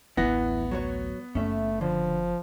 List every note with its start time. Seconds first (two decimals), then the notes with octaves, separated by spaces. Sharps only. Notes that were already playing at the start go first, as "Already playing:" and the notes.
0.17 D1 A1 E3 B3 E4 F#5 A#6
0.71 F#3 F#4 C#5
1.35 F#1 A3 C#4 E5
1.81 D3 F3